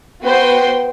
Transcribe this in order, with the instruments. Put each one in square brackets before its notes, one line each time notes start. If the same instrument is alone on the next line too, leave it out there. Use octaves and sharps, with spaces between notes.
[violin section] B3 F#4 B4 C5 G5 C6